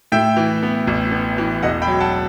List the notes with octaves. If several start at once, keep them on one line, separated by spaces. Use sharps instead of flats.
A2 E5 G5
E3
B3
A1
B3
E3
E1 D#5 F#5
G5 B5
F#3
F#5 A5